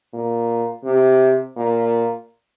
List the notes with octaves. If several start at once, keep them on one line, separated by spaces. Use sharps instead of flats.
A#2
C3
A#2